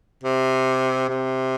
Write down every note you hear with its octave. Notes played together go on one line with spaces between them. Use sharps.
C3
C3